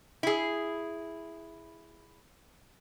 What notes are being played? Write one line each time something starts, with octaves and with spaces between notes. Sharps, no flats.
E4 G#4